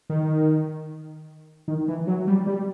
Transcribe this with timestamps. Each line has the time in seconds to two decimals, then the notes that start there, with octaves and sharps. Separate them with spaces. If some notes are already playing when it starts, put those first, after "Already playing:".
0.10 D#3
1.68 D#3
1.88 E3
2.07 F#3
2.27 G3
2.47 G3